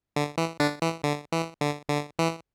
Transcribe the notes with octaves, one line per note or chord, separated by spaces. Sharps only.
D3
E3
D3 D4
E3
D3
E3
D3
D3
E3